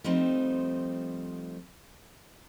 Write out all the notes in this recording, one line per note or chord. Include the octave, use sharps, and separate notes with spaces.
F3 G3 A3 C4 D#4